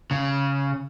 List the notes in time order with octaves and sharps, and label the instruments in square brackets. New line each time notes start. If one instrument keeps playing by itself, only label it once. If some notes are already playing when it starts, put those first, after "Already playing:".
[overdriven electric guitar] C#3